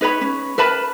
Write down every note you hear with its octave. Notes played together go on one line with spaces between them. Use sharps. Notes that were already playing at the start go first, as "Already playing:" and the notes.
D#4 B4 C#5 B5
C#4
A#4 B4 A5 B5